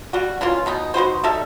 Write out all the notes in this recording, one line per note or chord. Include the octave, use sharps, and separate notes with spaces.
G3 F#4
E3 A#3 C#4 F4
B2 B3 D#4
D#4 F#4 B4 C5
G3 D#4 A4 E5